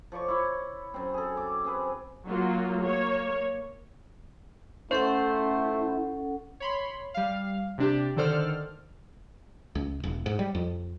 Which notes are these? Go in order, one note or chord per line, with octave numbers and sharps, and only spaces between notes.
F3 C#5 D5 C#6
E4 C#6
F#2 C4
G#4 A4
D6
C4 G#4 B4
F#3 A#3 F4
A#3 C#5
A3 C#4 E4 A4 C5 F#5
C#5 B5 C6
G3 F5
C3 D4 G4
D3 D#3 A4 C5 D5 F6
C#2
E1
G#2
G3
F2